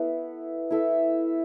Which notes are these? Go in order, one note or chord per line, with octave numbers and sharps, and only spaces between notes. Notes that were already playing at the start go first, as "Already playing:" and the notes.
Already playing: B3 E4 A4
E4 A4 E5